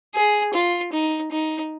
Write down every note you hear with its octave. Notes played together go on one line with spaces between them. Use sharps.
G#4
F4
D#4
D#4